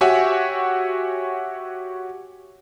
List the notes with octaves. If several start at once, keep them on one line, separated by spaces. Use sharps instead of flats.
F#4 G4 C#5 E5 F#5 G#5